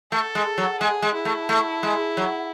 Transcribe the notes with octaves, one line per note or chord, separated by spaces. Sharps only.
A3 A4
G#3
F#3
G#3 G#4
G#3
E4
A3
A3
G#3
F#3